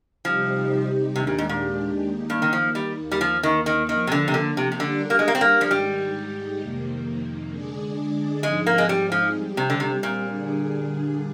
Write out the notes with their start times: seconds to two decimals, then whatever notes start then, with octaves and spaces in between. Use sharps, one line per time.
0.25 C3 F3 G3 C4 D#4 G4
1.16 D#2 C3 D#3 G#3 D4 G4
1.27 A#2
1.38 G#2
1.49 A#2
2.07 D#3 A#3 D#4
2.30 G2
2.42 D#3
2.53 F3
2.75 G3
2.98 D#2 D#3 A#3
3.12 G3
3.21 F3
3.43 D#3
3.66 D#3
3.89 D#3 F3 A#3 F4
4.07 C3
4.12 D3
4.28 C3
4.34 D3
4.57 C3
4.72 C3
4.80 D3 G3 D4 G4 A#4 D5
5.10 A#3
5.19 G#3
5.28 A#3
5.35 C4
5.41 A#3
5.61 F3
5.71 G#2 D#3 G3 G#3 D#4 G4
6.62 F2 C3 D#3 A#3
7.52 D3 G#3 D4 G#4 D5
8.43 G#2 F3 G#3 C4 D#4 G#4
8.66 A#3
8.78 G#3
8.89 G3
9.12 F3
9.34 G3 C4 G4
9.57 C3
9.70 D3
9.80 C3
10.03 A#2
10.26 D3 G3 D4 G#4